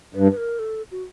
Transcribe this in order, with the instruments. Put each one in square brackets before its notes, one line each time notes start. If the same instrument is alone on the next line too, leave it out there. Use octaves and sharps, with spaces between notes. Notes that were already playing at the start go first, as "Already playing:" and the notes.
[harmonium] G2 [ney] B4
[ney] B4
A#4
A4
F#4